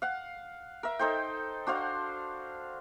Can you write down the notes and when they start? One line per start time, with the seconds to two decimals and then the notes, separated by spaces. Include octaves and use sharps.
0.02 F5 F#5
0.83 A#4 E5
0.99 D#4 A4 C5 G5
1.67 D4 F#4 C5 F5